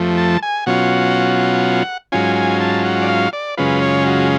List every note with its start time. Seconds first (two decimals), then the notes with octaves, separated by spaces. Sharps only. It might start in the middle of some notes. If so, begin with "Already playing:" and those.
Already playing: F2 F3 A3
0.18 A5
0.43 G#5
0.66 B2 F#3 C#4 F4 F#5
2.12 G#2 F#3 C#4 F4 G#5
2.36 G#5
2.60 A5
2.85 F#5
3.02 D5
3.08 F5
3.33 D5
3.57 F#2 C#3 G#3 C#4 F4 B4
3.82 C#5
4.06 F#4